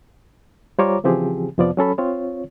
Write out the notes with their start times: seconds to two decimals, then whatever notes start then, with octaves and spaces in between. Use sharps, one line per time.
0.79 G3 F4 C5 C#5 A#5 D6
1.04 C#3 E3 F3 C4 G4 G#4
1.58 F2 C3 F3 B3 D5
1.77 F#3 C#4 A4 B5
1.98 C4 F4 C#5